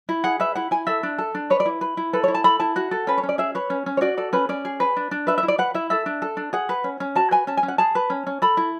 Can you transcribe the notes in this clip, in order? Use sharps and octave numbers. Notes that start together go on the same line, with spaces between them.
E4
G#4 F#5
B4 E5
E4 F#5
E4 G#5
A4 E5
D4
A4
D4
B4 C#5
D5
E4
B4
E4
A4 B4
C#5
E4
A5
A4 B5
E4 A5
F#4 F#5
A4
C#4 B4
C#5
C#4
D5
G#4 E5
B4 C#5
C#4
C#4
C#5
F#4 D5
A4 D5
C#4 B4
C#4 D5
G#4
B4
D4
D4
B4 E5
E5
E4
D5
B4 F#5
E4 E5
A4 E5
D4
A4
D4
G#4 F#5
B4
C#4
C#4
F#4 A5
B4 G#5
C#4 A5
G#5
C#4
F#5
G#4 A5
B4
C#4
C#4
A4 B5
E4